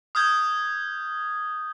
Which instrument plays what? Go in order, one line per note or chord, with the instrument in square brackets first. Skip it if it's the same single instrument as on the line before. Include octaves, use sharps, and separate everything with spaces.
[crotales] D#6 F6 G6 G#6